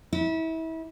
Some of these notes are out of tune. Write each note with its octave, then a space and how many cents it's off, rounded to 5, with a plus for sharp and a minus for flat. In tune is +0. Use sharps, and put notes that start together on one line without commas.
E4 -30